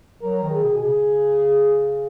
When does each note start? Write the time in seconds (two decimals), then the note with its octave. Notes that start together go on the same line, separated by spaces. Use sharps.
0.21 F#3 A#4
0.43 D#3
0.50 G#4
0.64 B2
0.78 G#4
0.85 C#3